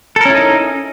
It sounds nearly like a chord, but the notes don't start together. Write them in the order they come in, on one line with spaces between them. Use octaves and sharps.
A4 A#4 C#4 E4 D#4